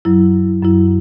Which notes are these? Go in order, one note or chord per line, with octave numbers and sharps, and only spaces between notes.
F#2 F#3 E4
F#2 F#3 E4